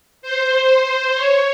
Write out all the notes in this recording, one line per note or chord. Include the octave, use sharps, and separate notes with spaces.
C5
C#5